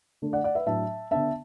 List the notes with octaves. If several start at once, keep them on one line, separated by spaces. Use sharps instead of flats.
D3 A3 D4
D5 F#5
D5 F#5
B4 E5
A2 F#3 D4 E5 A5
D3 B3 D4 E5 A5